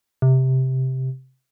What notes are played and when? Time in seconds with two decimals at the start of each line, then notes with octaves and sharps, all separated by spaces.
0.22 C3